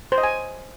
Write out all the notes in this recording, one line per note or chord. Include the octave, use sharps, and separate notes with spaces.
C5
D#5
G#5